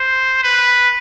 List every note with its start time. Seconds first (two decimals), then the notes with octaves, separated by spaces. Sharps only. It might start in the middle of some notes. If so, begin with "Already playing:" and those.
Already playing: C5
0.43 B4